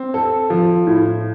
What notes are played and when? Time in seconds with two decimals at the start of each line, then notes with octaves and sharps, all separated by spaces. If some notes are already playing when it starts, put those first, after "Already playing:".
Already playing: C4
0.14 A4
0.50 F3
0.87 A2